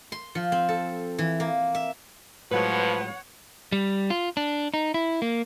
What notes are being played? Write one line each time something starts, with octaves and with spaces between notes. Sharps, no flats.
C6
F3
C4
A4
E3
A#3
E5
A2 F3 F#3 G#3 B4 C#5 F#5
G3
F4
D4
D#4
E4
A#3